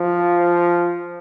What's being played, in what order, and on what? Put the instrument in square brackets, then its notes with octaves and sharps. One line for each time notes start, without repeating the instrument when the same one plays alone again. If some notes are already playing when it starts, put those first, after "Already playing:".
Already playing: [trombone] F3